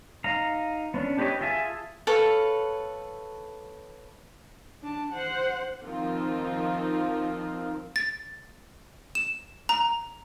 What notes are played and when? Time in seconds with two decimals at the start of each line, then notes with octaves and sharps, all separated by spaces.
0.24 D#4 F5 A#5
0.94 B3 C#4 D4
1.18 D4 G4 B4 C#5 D#5
1.41 F4 G#4 E5 G#5 A5
2.07 A4 B4 C#5 F5
4.82 D4 A5
5.13 C5 F#5
5.85 D#3 F3 C4 D#4 F4
7.96 A6
9.15 E7
9.69 A#5